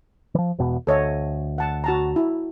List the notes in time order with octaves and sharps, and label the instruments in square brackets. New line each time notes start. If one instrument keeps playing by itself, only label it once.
[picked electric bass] E3 F3
E1 E2 B2
[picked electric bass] D2 [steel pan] A4 C#5 D#5
[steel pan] F#5 A5
F#4 A5 A#5
E4